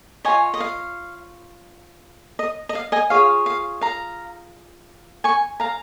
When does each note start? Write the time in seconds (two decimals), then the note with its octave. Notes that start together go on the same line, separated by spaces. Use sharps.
0.25 F4 C#5 D#5 G#5
0.54 D#5
0.60 F5
2.39 D#5
2.69 D#5
2.75 F5
2.92 D#5 G#5
3.10 F4 G#4 C#5 F5
3.46 F5
3.81 F5 A#5
5.24 G#5 C#6
5.60 F5 A#5